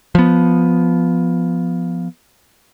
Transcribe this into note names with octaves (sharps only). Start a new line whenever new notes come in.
F3 B3